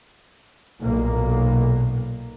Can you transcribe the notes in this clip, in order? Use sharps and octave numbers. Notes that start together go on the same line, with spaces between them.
B1 A#2 A#3